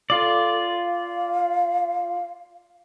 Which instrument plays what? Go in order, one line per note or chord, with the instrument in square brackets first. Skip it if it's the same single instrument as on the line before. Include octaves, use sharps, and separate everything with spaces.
[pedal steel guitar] F4 D5 [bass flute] A4
[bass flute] F5